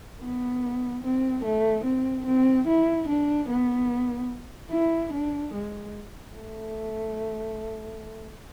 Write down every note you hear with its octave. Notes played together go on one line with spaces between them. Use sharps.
B3
C4
A3
C4
C4
E4
D4
B3
E4
D4
G#3
A3